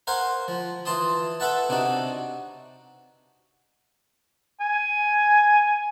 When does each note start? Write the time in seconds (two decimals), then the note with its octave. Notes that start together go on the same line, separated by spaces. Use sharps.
0.07 A#4 C5 F5 F#5 G#5 A#5
0.48 F3
0.85 E3 F4 A5 C6 D#6
1.40 A4 B4 E5 F#5 A5
1.69 C3 D4 D#4 F#4
4.60 G#5